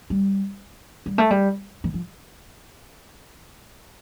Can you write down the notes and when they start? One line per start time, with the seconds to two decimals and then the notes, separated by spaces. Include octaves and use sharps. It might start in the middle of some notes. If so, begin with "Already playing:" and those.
0.10 G3
1.06 G3
1.18 A3
1.31 G3
1.84 E3
1.94 F3